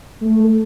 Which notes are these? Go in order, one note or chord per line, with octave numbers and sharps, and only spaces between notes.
A3
A3